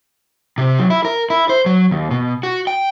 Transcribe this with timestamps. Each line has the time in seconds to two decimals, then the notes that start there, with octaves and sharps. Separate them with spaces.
0.58 C3
0.79 F#3
0.90 E4
1.05 A#4
1.30 E4
1.49 C5
1.66 F#3
1.91 D#2
2.11 B2
2.43 F#4
2.67 G5